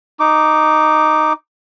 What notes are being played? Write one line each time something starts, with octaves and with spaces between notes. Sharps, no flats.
D#4 D6